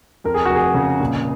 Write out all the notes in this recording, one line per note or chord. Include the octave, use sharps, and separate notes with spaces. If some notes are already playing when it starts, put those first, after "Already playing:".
F2 A#4
G#4
F1 F#4
G#4
C#3
A#2